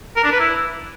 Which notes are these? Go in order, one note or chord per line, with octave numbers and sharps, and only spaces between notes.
A#4
D4
B4
E4